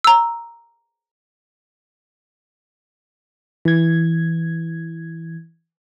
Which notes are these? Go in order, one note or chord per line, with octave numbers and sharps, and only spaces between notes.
A#5 E6
E3 G#6